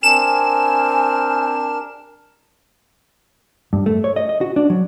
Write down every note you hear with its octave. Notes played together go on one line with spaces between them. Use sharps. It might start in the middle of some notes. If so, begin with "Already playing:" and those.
C4 D4 A#4 G#5 F6 E7
G2
A3
C#5
D#5
D#5
F#4
D4
F#3